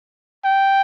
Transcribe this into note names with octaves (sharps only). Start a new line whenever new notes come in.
G5